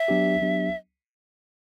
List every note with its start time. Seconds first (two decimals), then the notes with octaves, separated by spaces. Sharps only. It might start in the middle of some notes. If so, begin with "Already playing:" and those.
Already playing: E5
0.08 F#3 B3 D4 G4
0.42 F#3 B3 D4 G4